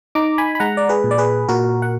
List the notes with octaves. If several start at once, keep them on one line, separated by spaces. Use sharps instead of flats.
D#4 A#5 D6
G#5 B5
B5
G#3 F#5 A#5
D5
G#4 B4
A#2
D5
G#4 B4
A#2 F#4 A#4
F#5